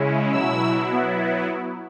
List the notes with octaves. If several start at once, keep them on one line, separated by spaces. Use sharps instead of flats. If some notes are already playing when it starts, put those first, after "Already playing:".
Already playing: C#3 G#3 C#4 E4
B2 F#3 E4 E6
F#3 B3 E4